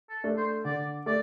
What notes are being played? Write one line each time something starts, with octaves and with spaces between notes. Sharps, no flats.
A4
A3 D4
C5
D3 D5
A3 D5